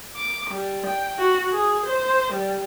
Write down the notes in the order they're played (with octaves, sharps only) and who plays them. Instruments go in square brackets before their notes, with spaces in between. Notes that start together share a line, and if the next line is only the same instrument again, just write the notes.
[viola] D6
G3
G5
F#4
G#4
C5
G3